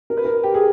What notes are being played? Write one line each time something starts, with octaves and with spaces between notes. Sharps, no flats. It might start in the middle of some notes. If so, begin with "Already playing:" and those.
A#4
B4
A#4
G4
G#4